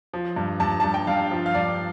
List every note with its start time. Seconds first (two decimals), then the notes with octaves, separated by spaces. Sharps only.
0.13 F3
0.36 G2
0.60 G2 A5
0.80 G2 A5
0.94 G5
1.07 G2 F5
1.31 F3
1.46 F5
1.54 G2 D5